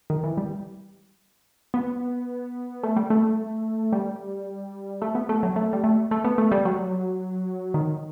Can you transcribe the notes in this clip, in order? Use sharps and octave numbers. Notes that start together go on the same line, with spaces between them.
D#3
E3
G3
B3
A3
G3
A3
G3
A3
B3
A3
F#3
A3
G3
A3
A3
B3
A3
G3
F#3
D#3